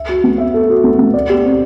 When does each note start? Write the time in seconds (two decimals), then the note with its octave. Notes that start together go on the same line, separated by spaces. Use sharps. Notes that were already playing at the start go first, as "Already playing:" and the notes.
Already playing: E5
0.09 F#4
0.24 B3
0.38 E5
0.54 A4
0.70 F#4
0.84 B3
0.99 B3
1.14 D5
1.29 G4
1.45 C4